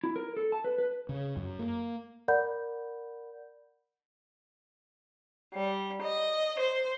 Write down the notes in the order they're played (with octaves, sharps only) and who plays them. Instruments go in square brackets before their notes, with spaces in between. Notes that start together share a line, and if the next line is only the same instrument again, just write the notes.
[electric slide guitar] E4
A#4
A4
A5
B4
B4
[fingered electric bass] C#3
F#2
A#3
[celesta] A#4 D5 F#5 B5 G6
[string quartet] G3
D#5
C5